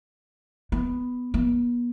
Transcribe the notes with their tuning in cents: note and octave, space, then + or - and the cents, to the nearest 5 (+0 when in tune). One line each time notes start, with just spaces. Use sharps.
B3 +5
B3 -40